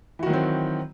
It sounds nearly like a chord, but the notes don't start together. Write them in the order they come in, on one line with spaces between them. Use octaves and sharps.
E3 F#4 D#3 F#3 C4